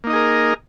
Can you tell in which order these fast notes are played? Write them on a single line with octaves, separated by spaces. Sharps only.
A#3 D#4 D#5 G#4 A#4